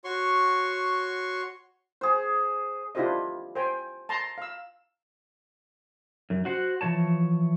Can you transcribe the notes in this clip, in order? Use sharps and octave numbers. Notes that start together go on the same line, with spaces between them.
F#4 C#5 C6 C#6
G#4 C5
D4 E4 F4 G4 C5 D#5
C5 G5 G#5
A5 A#5 C6
F5 E6
F#2
F#4 C5 F#5
E3 F3 C#5 A5